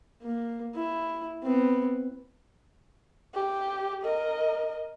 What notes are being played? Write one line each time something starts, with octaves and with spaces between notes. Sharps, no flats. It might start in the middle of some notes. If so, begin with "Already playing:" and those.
A#3
E4
B3 C4
G4
A#4 D#5